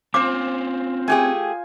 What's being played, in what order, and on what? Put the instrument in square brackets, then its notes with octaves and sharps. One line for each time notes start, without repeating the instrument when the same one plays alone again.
[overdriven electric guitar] C4 C#4 [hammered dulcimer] F4 C5 [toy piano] D6
[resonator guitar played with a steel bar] A3 G4 G#4 [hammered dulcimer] G#5